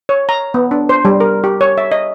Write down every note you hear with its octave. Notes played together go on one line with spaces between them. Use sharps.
C#5
A#5
B3
D4
C5
G3
A#4
G4
C#5
E5
D#5